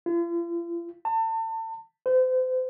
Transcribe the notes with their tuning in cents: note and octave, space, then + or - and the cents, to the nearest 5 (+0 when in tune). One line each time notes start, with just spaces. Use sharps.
F4 -45
A5 +35
C5 -35